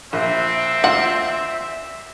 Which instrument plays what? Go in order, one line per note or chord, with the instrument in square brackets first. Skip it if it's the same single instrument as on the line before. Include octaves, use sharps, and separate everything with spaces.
[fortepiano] A#1 [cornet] C4 [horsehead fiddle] E5
[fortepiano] D2 F4 C6 [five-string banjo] F#5